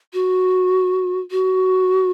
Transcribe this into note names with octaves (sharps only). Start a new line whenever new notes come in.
F#4
F#4